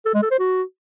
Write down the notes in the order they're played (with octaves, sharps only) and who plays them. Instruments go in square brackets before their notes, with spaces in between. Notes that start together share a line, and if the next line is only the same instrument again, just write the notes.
[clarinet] A4
G#3
A4
C5
F#4